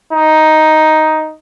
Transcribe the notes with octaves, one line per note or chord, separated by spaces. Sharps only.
D#4